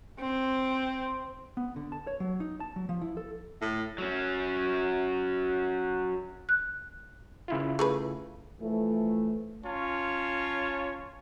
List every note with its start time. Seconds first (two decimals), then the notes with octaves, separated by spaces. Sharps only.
0.20 C4
1.57 B3
1.76 D3
1.92 A5
2.07 C#5
2.20 F#3
2.40 D#4
2.60 A5
2.76 F#3
2.89 F3
3.01 E4
3.17 A4
3.61 A2
3.98 F#3 C#4
6.49 F#6
7.48 C#3 E4 F4
7.79 A3 G#4 B4
8.61 E3 F3 A3
9.65 C#4 F4 C#5 A5